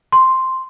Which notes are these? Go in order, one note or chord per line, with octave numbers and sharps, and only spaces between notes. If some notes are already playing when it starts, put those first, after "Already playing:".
C6